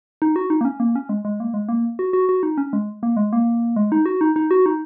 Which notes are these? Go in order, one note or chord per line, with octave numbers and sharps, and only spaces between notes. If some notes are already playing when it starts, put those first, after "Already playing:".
D#4
F#4
D#4
A#3
C#4
A#3
C#4
G#3
G#3
A#3
G#3
A#3
F#4
F#4
F#4
D#4
C#4
G#3
A#3
G#3
A#3
G#3
D#4
F#4
D#4
D#4
F#4
D#4